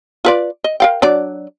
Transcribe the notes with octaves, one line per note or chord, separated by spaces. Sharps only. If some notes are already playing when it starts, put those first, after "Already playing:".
F4 B4 D5
D#5
A#4 F5 G5
F#3 D4 D5